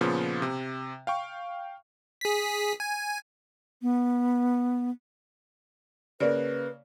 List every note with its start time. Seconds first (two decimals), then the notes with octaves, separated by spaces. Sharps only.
0.01 A#2 C#3 F3 B3
0.42 C3
1.07 F5 G5 C#6
2.21 G#4 B6
2.80 G#5
3.82 B3
6.20 C#3 A#3 B4 C#5 D5